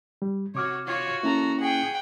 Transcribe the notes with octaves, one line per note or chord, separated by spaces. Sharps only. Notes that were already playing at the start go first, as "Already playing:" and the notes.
G3
C3 F#4 C#5 D6 F6
F4 F#4 C#5
A#3 C#4 E4 A4 A#5
G#4 F#5 G5